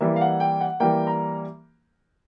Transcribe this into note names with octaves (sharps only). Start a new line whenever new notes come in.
E3 G3 A#3 E5
F5
F#5
G5
F#5
E3 G3 A#3 G5
A#5